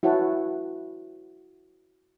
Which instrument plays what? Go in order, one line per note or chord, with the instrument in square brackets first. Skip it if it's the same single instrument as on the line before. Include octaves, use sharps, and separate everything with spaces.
[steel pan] E4 F#4 B4 C#5 F#5 A5